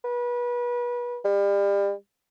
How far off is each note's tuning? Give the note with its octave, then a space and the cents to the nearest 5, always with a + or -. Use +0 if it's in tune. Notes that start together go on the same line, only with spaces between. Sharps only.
B4 -30
G3 +35